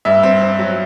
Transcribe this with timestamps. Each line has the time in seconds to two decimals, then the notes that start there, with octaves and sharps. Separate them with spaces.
0.05 G2 E5
0.23 C4
0.41 C4
0.59 F#3